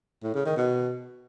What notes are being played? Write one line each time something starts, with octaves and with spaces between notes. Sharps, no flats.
A2
C#3
D#3
B2